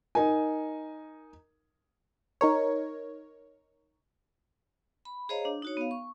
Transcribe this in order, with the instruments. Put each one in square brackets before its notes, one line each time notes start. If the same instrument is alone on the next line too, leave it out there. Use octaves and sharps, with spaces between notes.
[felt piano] D#4 A#4 G#5
[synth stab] D#4 A#4 C#5
[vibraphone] B5
G#4 C5 C#5 D#5 F5 A#5
D4
D#4 F#4 C#5
B3 F5
C#6